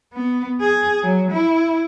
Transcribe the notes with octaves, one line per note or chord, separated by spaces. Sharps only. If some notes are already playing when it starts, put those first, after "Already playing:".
B3
G#4
F#3
E4